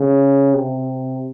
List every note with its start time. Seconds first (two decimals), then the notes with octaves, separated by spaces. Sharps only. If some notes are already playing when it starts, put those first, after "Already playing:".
Already playing: C#3
0.54 C3